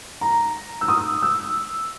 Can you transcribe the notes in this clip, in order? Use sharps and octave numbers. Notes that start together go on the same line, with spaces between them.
A#5
E6
D#6
E6